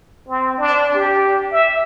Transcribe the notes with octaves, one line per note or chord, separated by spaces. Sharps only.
C4
D4
G4
E5